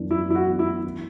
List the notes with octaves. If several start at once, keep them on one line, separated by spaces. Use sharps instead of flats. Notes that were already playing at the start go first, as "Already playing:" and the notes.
Already playing: F#2 E3 B3 D4
F#2 E4
E4
F#4
E3 B3 D4
E4
E3